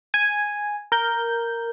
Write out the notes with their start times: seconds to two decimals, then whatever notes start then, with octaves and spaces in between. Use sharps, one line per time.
0.14 G#5
0.92 A#4 G6